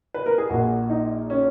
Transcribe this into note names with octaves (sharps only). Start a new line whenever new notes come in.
B4
A#4
G#4
A#1 A#2 A#3 F#4
D#4
C#4